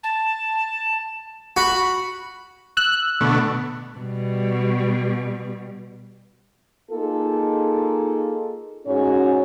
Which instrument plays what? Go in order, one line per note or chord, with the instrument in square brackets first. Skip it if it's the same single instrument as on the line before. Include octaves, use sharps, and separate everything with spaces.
[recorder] A5
[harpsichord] F#4 [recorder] B5
[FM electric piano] E6 F#6
[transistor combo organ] B2 D3 A3
[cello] B2 G3
[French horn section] A#3 D#4 F4 G#4 A4
G#2 G#3 C#4 F#4 G#4 C#5